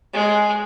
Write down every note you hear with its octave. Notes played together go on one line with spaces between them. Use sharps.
G#3